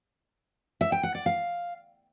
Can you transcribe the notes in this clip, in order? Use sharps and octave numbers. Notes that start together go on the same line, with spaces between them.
E5
G5
F#5
D5
F5